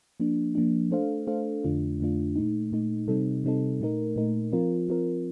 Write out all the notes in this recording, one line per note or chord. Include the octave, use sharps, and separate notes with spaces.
F3 A#3 D4
F3 A#3 D4
A3 D4 A4 C5 F5
A3 D4 A4 C5 F5
F2 D3 A3 D4 F4
F2 D3 A3 D4 F4
A#2 A3 D#4
A#2 A3 D#4
C3 G3 C4 D#4 A4
C3 G3 C4 D#4 A4
A#2 A3 D#4 A#4
A#2 A3 D#4 A#4
F3 C4 F4 A#4
F3 C4 F4 A#4